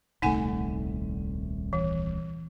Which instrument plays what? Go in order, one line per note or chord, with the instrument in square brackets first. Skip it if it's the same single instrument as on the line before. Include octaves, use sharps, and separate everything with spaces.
[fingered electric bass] D#1 C2 A3 [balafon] D#4 F#5 G#5
[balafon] E3